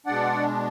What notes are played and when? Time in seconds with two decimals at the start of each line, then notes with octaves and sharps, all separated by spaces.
0.06 B2 G#3 D4 D5 F#5